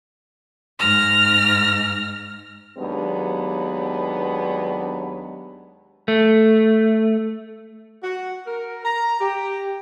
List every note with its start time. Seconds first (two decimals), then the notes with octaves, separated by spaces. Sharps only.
0.79 G#2 F6 A#6
2.78 D#2 F#3 G#3 B3 D4
6.08 A3
8.03 F#4
8.47 A#4
8.85 A#5
9.20 G4